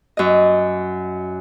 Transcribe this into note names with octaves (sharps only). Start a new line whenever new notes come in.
F#2 D#5